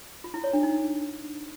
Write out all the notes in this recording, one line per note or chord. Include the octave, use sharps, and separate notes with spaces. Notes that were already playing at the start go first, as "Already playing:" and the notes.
F4
E4
C#5
D4
D#4